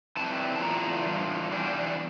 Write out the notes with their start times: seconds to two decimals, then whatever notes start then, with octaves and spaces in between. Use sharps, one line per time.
0.17 E3 G3 C4 A5
0.56 A5
0.61 E2 E3 A3 D4 F4 A#5
1.06 E3 G3 D4 F4
1.51 E2 E3 G3 D4